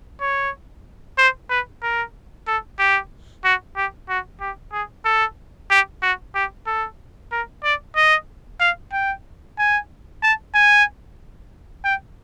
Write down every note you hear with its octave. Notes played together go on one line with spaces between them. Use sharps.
C#5
C5
B4
A#4
A4
G4
F#4
G4
F#4
G4
G#4
A4
G4
F#4
G4
A4
A#4
D5
D#5
F5
G5
G#5
A5
G#5
G5